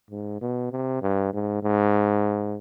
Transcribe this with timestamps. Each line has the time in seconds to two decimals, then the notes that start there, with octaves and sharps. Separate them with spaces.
0.11 G#2
0.41 B2
0.71 C3
1.02 G2
1.33 G#2
1.63 G#2